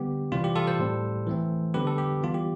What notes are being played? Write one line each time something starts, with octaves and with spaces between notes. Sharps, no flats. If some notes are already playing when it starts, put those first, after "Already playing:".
Already playing: D3 G3 B3 G4
C3 E3 G3 C4 F4
G4
F4 A4
A4 C5
A2 G3 C4
E3 A3 C4
D3 G3 B3 G4 B4
A4
G4
E3 G3 B3 F4
G4